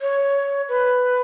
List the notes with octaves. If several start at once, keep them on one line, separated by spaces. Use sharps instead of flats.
C#5
B4